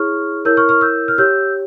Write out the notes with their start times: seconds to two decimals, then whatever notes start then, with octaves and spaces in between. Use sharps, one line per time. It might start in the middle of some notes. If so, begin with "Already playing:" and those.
Already playing: E4 G#4 C#5 C#6 F6
0.45 E4 A#4 C#5 E6 G6
0.57 C#6 F6
0.69 C#6 F6
0.81 E6 G6
1.08 F6
1.18 G4 C#5 E6 G6